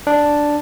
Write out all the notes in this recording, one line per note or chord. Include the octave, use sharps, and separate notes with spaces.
D4